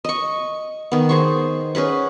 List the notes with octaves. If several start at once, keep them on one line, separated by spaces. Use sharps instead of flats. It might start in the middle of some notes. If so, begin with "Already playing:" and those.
D#5 C#6
D#3 B3
G#4 C5 C#6
C#4 G#4 B4 F#5